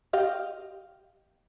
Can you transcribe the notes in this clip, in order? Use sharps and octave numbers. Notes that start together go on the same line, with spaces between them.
G4 D#5 F5